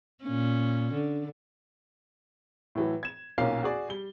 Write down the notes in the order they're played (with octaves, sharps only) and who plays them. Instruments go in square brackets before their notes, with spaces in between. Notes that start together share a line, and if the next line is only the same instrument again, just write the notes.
[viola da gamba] A#2 C#4
D3
[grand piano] A2 E3 F#3
G#6 E7
B1 A#2 A#3 C#4 F5 C7
F#4 G#4 D5
G3 G7